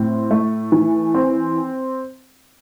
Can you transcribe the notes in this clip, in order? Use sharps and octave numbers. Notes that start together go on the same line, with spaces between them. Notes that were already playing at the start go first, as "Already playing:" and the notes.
Already playing: A2 C4
A3
E3
C4